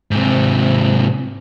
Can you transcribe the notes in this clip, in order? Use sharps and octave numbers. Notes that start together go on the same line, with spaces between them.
G#2 C3